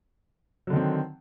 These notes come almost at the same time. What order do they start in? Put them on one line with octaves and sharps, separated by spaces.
F#3 D3 D#3 C4